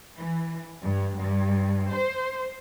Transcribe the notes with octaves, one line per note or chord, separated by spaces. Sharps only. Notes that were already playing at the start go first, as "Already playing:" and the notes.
E3
G2
G2
C5